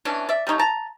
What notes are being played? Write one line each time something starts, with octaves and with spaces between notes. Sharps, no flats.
B2 E3 C#4 D4
D5 E5
G3 A3 D#4 C#5
A5 A#5